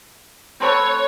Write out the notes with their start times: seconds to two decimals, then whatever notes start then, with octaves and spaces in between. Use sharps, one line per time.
0.60 C4 A4 B4 C#5